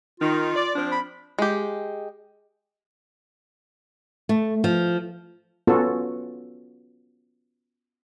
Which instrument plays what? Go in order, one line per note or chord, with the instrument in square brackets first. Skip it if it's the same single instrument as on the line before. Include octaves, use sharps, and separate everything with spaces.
[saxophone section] D#3 [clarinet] F4
[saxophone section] D5
F3 C4 D4
[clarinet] B5
[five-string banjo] G#3 G4
[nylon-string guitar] A3
F3
[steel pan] B3 C#4 F4 F#4 A4